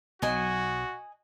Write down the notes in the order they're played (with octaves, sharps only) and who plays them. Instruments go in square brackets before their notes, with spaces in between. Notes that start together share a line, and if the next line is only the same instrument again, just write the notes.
[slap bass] B1 F#3 [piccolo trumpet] F#4 [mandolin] D#5 G#5